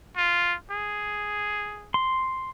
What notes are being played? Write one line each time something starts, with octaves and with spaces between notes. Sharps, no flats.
F4
G#4
C6